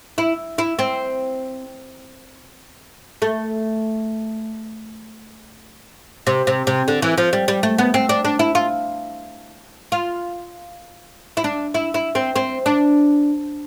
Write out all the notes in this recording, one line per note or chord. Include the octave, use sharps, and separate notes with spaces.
E4
E4
C4
A3
C3
C3
C3
D3
E3
F3
G3
G3
A3
B3
C4
D4
D4
E4
F4
F4
E4
D4
E4
E4
C4
C4
D4